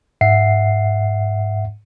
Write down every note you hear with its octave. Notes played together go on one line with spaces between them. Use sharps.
G#2 E5 F#5 C7